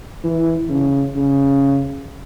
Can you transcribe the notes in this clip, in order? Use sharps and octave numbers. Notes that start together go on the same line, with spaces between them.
E3
C#3
C#3